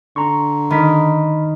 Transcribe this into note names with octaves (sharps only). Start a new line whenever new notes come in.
D3 A#5 C6 C#6
D#3 B5 B6